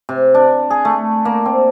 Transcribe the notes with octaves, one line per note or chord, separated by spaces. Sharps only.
C3
D4
G#4
A3
A#3
C4